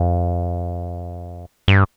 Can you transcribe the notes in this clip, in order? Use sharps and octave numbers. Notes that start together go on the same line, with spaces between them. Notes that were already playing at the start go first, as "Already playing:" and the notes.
Already playing: F2
G2